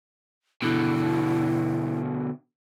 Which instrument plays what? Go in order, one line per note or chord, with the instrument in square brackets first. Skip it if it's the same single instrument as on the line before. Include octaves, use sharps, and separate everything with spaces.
[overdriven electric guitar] B2 D3 [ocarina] E4